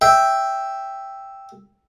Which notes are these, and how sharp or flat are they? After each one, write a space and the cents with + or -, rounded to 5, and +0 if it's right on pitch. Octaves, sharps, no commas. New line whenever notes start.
E5 +0 G5 +0